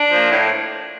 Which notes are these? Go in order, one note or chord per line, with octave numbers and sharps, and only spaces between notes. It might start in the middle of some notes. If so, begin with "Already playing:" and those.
Already playing: D4
F3 A#3
A2